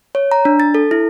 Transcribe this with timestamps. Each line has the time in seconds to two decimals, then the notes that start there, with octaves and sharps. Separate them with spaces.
0.15 C#5
0.32 A#5
0.45 D4
0.60 A6
0.75 A4
0.91 E4